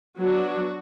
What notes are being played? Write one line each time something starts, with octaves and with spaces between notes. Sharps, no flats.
F#3 B3 D4 F#4